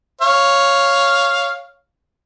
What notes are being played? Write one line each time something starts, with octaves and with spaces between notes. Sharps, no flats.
C#5 F5